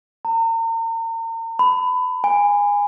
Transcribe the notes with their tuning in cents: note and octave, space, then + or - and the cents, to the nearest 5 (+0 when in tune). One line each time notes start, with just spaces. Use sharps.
A#5 -40
B5 +20
G#5 -20